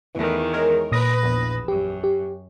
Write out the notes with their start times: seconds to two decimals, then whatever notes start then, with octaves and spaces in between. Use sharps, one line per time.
0.15 E2 D#3 E3 A3
0.54 G#3 A#4 C#5
0.92 A#2 B4 D#6 A#6
1.23 A#1 E2 E7
1.68 F#2 G4
2.04 G4